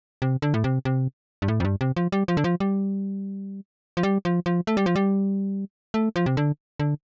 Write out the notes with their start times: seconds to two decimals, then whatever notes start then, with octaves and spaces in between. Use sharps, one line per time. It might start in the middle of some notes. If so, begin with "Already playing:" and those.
0.22 C3
0.42 D3
0.54 A2
0.64 C3
0.85 C3
1.42 G2
1.48 A2
1.60 F2
1.65 G2
1.81 C3
1.96 F3
2.12 G3
2.28 F3
2.37 D3
2.44 F3
2.60 G3
3.97 F3
4.03 G3
4.25 F3
4.46 F3
4.67 A3
4.77 G3
4.86 F3
4.96 G3
5.94 A3
6.16 F3
6.26 C3
6.37 D3
6.80 D3